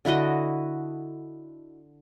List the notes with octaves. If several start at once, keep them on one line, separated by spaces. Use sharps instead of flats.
D3 E4 F#4 D#5